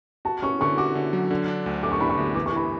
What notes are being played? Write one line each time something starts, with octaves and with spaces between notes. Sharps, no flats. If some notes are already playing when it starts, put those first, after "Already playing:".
F#4 A5
C#4 C#6
D3 C#6
F#4 D6
D3
F#3
D3
D4
D2
A3 D6
C#6
D4 B5
C#6
D2
E3 D6
C#6
E3 B5